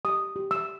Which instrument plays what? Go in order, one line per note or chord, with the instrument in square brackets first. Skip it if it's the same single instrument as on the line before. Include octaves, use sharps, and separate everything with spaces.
[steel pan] G4 D#6
G4
E6